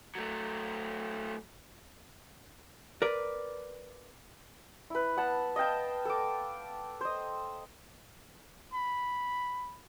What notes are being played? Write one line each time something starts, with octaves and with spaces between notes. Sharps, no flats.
F#3 A3
A#4 B4 D5
E4 B4
B3 F#5 A5
D#5 F5 G5 A5
A4 D6
C5 D#5
B5